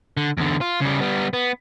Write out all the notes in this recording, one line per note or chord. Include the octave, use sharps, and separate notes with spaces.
D3
E2 D3
F4
C#3 G3
G3 B3
B3